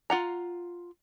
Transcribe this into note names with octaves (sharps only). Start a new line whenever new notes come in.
F4 F#5 A#5